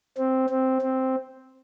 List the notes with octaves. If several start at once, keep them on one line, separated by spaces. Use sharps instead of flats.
C4
C4
C4